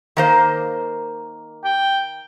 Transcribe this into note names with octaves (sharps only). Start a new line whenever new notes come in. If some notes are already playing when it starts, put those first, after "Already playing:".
D#3 A#3 C5
G5